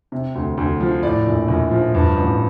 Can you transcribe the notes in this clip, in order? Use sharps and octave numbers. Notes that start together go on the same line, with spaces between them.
C3
D2
D2
F3
A2 D5
A#1
A#1
F3
G2
A1